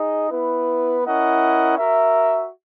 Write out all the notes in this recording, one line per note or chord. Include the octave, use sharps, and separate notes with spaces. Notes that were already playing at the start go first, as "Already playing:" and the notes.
Already playing: D#4 G#4 D#5
B3 E4 B4
C#4 E4 A#4 D#5 F#5
F#4 A#4 E5